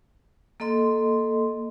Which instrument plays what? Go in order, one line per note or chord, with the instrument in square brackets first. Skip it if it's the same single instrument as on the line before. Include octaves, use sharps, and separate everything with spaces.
[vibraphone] A#3 A4 D#5 C6